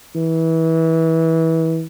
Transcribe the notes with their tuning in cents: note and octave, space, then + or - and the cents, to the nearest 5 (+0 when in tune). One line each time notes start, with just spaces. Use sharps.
E3 -25